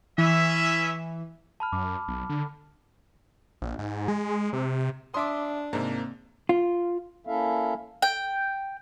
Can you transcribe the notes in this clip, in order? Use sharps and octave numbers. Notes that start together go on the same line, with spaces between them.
E3 C#4 E4 E5
A5 B5 F6
F#2 D6
B1
D3
A#1
G#2
G#3
C3
D4 E5 C6 D6 D#6
G#2 C3 A#3
F4
A#3 C#4 E4 A4 E5 F5
G5